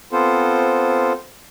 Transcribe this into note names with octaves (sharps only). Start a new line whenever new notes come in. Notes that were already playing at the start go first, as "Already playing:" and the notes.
B3 C4 F4 A4 C5